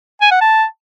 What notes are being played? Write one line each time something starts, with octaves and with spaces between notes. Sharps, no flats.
G#5
F#5
A5